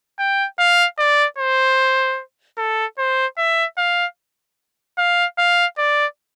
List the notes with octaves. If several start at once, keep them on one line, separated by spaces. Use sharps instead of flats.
G5
F5
D5
C5
A4
C5
E5
F5
F5
F5
D5